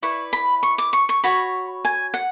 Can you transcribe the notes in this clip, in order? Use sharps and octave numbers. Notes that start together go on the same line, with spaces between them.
E4 B4 D5 C#6
B5
C#6
D6
C#6
C#6
F#4 C#5 B5
G#5
F#5